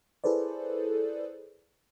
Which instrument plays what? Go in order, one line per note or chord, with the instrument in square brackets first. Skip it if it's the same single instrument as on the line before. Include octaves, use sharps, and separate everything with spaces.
[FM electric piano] E4 G#4 A4 B4 C5 D5